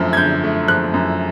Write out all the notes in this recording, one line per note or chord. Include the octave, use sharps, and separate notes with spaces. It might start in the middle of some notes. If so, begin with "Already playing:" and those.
Already playing: F#2 D3 F3 A3
G#6
D3 G6
A3
F3 F#6
F#2